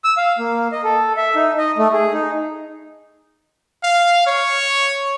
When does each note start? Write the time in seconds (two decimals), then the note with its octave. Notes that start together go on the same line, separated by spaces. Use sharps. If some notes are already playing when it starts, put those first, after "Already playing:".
0.04 E6
0.17 F5
0.38 A#3
0.72 D#5
0.84 A4
1.17 E5
1.35 D#4
1.58 D#5
1.78 A3
1.93 G#4
2.13 D#4
3.84 F5
4.27 C#5